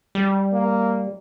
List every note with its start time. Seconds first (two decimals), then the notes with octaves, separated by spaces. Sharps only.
0.15 G3
0.53 A#3